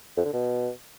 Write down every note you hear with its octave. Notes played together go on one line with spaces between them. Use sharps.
F2
D3
B2